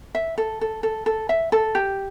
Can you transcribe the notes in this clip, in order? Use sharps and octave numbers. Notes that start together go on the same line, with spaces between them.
E5
A4
A4
A4
A4
E5
A4
G4